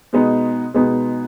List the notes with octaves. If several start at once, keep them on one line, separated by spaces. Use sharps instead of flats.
B2 G#3 B3 D#4
B2 G#3 B3 D#4